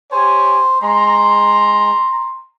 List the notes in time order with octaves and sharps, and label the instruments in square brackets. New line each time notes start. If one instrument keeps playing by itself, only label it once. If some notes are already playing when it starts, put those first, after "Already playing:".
[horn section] G4 C#5 G#5 [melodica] C5
[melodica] G#3 [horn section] A#5 C6